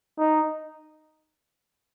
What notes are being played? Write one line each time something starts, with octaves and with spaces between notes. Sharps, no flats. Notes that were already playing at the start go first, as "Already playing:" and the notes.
D#4